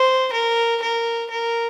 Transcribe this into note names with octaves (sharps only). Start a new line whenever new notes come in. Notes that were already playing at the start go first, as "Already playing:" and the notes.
Already playing: C5
A#4
A#4
A#4